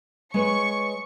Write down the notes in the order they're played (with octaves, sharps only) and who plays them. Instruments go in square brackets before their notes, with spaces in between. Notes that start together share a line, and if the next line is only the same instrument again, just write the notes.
[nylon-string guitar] G#3 B4 C#5 [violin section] C#6 C#7